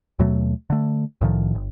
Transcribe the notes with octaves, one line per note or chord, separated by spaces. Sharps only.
D#2 B2 F#3 A3
D3 A3
C2 A2 D#3 F3
G1